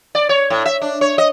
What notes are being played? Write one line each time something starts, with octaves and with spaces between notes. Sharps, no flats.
D5
C#5
A2
E5
D4
C#5
D#5